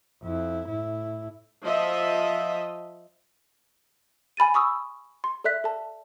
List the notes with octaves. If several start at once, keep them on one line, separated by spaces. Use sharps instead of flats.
F2 E4
A2 E4
F3 D#5 E5
G#5 B5 A6 D#7
B5 C#6 D#6 E6
C6
A4 D5 E5 F#6 B6
A4 A5